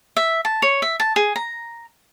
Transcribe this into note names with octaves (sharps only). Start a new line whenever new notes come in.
E5
A5
C#5
E5
A5
G#4
A#5